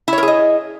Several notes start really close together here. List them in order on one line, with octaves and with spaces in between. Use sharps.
E4 C#5 A#4 G#4 D#5